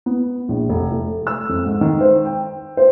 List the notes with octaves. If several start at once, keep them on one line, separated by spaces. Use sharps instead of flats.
B3
A#1
F1
A3
E6
F2
G#2
D#3
C5
G5
C5